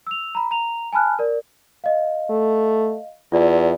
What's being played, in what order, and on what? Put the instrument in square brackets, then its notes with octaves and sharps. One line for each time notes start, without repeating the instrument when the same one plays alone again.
[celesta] E6 F7
A#5 B5
A#5 F7
G#5 A5 B5 F6 F#6
A#4 D5
D#5 F5
[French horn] A3
[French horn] E2 [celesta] F4 D5 E5